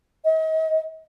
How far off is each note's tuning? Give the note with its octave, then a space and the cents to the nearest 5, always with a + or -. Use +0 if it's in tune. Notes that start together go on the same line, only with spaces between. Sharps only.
D#5 +40